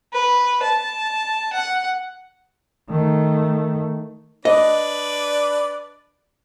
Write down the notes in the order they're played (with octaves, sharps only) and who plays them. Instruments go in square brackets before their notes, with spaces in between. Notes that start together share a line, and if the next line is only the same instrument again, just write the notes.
[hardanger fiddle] B4
A5
F#5
[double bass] D#3 A3
[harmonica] D4 B4 D5 [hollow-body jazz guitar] D#5